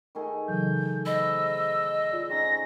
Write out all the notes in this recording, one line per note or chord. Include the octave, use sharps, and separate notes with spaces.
D#3 A3 G#4
C#3 E3 F#3 G6
B4 C5 D#5 E6
F4 G#4 D5
C4 C#4 D#4 A#6